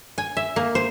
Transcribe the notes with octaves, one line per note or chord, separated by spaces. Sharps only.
G#5
E5
A#3
C5